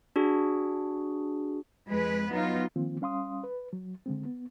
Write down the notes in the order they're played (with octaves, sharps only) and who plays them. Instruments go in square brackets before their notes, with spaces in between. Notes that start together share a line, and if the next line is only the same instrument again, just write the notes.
[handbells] D4 F#4 G#4
[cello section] F2 G#3 B4
F#3 B3 D#4 F4
[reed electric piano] D#3 F3 A#3 C4 F4
G3 C#4 F5 C6 D#6
B4
F#3
D3 G#3 C4
B3